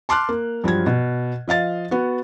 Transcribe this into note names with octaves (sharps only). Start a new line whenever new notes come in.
A5 C6 D6 F6 F#6
A#3
G2 F3 F#3 G#6
B2
F3 D#5 F5 A6
B3 F#4